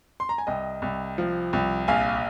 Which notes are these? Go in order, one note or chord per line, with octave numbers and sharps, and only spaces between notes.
C6
A#5
G#5
C2 D#5 G5
C2
F3
C2
A#1 F5 G#5